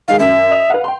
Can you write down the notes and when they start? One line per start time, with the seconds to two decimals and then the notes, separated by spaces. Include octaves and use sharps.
0.08 D#3 G#3 G#4 F5
0.20 F#2 E5
0.51 D#5 D#6 F7
0.70 B4 F5 F#5
0.84 G5 C6